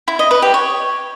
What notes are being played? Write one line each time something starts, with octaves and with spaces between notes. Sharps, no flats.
E4
D#5
B4
G4
C#5